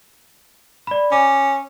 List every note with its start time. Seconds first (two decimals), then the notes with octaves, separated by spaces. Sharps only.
0.87 D5 B5
1.12 C#4 D6